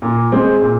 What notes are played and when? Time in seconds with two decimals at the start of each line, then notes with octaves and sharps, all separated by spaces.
0.02 A#2
0.32 G#3 C4 G#4 C5
0.62 A#2